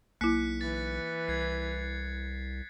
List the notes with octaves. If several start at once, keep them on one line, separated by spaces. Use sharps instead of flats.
B1 A#3 E4 F#6 B6 C#7
E3 A6
C2 G#6 C7